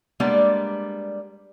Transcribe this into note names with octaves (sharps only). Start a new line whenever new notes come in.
G3 G#3 A#3 B3 D4 D5